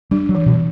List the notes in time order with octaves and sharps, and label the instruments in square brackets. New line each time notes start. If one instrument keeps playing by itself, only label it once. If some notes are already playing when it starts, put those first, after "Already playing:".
[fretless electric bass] G3 [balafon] D4
[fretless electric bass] F#3
[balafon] E3
[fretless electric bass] B2